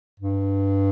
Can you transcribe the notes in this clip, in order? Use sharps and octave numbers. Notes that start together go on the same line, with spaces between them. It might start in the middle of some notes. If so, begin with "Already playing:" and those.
G2